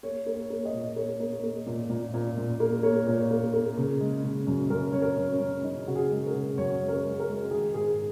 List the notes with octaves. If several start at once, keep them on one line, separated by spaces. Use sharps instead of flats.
A#3 C#5
A#3
C#5
A#3
D#5
A#2
A#3 C#5
A#3
A#3
A#2
A#2
A#2
A#2
A#3
A#3 C#5
A#2
A#3
A#3
C#3
G#3
C#3
F#2
F#2 A#4
F#2 C#5
A#4
F#2
C#4
F#2
F#2 D#4
C#3 F#4
G#4
G#3
A#4
C#3
F#2 C#5
G#3
A#4
G#3
A#4
G#3
D#3 G#4
G#2 G#4